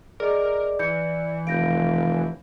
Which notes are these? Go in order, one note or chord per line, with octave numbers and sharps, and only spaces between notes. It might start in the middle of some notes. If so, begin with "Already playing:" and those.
G#4 A#4 D5 D#5 D6
E3 G6 C#7
F1 F5 G6 A#6 D7